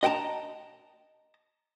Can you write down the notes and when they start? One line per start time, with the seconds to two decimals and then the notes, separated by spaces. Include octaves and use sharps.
0.03 D#5 F#5 G5 A5 A#5